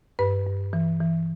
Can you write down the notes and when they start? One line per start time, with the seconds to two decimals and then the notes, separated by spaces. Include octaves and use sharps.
0.19 G2 B4
0.47 G2
0.73 E3
1.01 E3